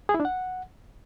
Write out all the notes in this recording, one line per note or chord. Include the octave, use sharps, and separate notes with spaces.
G#4
E4
D4
F#5